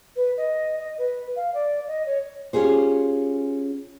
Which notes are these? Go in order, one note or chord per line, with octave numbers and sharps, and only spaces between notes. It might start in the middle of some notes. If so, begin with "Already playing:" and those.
B4
D#5
D#5
B4
F5
D5
D#5
C#5
C#4 F4 G4 G#4 C5